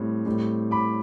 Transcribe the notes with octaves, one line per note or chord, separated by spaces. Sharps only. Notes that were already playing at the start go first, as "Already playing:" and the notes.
Already playing: A2 G3 C4
A2 G3 C4
B5 D6